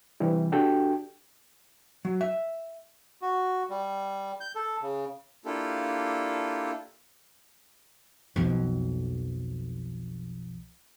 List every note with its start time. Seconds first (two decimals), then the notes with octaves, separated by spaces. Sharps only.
0.20 C3 E3 G3
0.52 D4 F#4 G4 A4 G5
2.05 F#3
2.21 E5
3.22 F#4
3.70 G3
4.41 G6
4.55 A4
4.82 C#3
5.45 A#3 D4 E4 F4 G4 A4
8.36 B1 F2